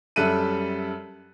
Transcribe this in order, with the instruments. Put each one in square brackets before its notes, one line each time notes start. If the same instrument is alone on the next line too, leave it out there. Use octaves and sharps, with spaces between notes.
[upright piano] F#2 G3 A4 E5 F#6 D#7